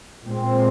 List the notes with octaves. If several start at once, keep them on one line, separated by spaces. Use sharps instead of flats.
A#2 G#3 C4